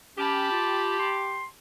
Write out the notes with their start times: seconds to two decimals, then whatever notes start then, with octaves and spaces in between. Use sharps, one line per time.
0.18 C#4 G4 A5 B5
0.52 F4
0.99 C6